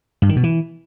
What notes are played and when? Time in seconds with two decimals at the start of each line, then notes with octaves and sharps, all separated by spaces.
0.22 G2
0.29 D#3
0.36 B2
0.43 E3